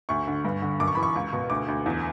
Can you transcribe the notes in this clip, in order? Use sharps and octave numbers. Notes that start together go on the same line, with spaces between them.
D2 C#6
D3
G2
D3
F#2 D6
C#6
E3 B5
C#6
C#2
B2
D2 D6
D2
E2